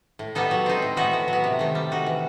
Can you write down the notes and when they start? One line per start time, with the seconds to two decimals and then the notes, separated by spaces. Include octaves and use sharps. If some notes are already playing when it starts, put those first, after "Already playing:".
0.19 A2
0.35 G3 B3 D#4 A4
0.51 F#3
0.66 C4 D#4
0.82 A2
0.97 E3 B3 D#4 F#4
1.13 A2
1.28 F#3
1.33 B3
1.44 C3
1.59 D#3 A3
1.75 G3
1.91 D#4 F#4
2.06 E3